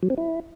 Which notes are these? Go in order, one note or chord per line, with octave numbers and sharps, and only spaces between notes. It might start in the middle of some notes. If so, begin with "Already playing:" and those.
F#3
C4
E4